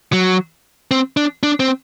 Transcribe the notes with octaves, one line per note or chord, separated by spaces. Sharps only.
F#3
C4
D4
D4
C4